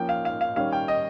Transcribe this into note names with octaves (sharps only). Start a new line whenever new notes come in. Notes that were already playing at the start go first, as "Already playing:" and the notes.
Already playing: F3 A#3 C#4 G5
F5
F5
F5
D#3 G3 C#4 F5
G5
D#5